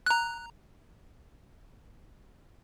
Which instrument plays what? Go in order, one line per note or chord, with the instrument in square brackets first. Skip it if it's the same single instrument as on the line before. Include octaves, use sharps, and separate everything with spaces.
[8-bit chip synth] A#5 F#6